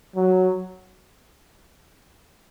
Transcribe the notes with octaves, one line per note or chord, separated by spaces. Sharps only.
F#3